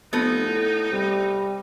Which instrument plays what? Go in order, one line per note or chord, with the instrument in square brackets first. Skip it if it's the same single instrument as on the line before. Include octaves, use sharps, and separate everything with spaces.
[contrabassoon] F1 [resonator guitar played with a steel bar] B3 C4 A4 [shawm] D#4
[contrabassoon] A2
[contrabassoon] C3 [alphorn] G3